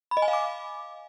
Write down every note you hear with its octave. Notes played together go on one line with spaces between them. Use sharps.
B5
D#5
G#5
F5
D6